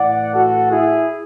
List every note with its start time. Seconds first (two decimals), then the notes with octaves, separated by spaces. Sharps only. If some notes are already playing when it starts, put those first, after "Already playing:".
Already playing: A2 E3 D5 F#5
0.32 F#4 A4
0.69 E4 G#4